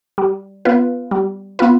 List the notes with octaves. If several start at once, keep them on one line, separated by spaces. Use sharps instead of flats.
G3
B3 F4 B4
G3
B3 F4 B4